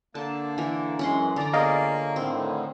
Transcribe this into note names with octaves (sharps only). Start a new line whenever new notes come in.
D3 A#3 A5
E3 A#4
F#2 E3 G#3 C#4 F#5 C6
D3 D5 A#5
A#3 B3 F4 G#4 C#5 D#5 F5 A#5
A2 D3 D#3 C4